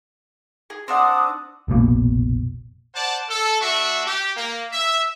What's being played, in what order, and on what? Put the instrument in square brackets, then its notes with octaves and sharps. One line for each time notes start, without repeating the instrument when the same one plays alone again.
[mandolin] G#4
[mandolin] C4 D4 F#5 [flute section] D6 D#6
[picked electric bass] F1 A#1 B2 A#3
[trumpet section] C5 D5 F#5 A5
A4
A3 D4 F#4 E5 C#6
G4
A#3
E5